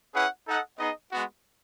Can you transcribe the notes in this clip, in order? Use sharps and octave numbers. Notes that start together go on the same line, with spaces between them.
C#4 E4 G#4 B4 F#5
D#4 A4 D#5 F#5
B3 D#4 G#4 D#5
G#3 B3 F#4